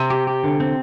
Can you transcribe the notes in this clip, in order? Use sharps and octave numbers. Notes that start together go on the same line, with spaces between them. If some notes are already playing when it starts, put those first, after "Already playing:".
Already playing: C3
G4
G4
D3
C4